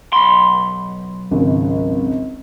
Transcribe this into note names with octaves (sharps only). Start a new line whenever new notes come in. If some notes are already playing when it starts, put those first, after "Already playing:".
B1 B5 C6
G#1 C#2